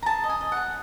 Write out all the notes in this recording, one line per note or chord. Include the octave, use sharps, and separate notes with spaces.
A#5
G#4 A5
D#5
G#5
D#5
G#4 F#5